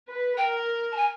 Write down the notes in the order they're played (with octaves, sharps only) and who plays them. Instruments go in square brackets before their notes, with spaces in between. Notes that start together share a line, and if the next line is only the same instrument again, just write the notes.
[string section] B4
[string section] A#4 [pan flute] G5
[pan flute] A5
G#5